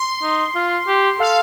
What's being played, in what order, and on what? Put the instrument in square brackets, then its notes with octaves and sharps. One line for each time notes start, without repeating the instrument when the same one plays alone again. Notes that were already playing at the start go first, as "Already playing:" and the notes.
Already playing: [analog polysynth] C6
[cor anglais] D#4
F4
G4
[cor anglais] A4 [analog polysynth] F5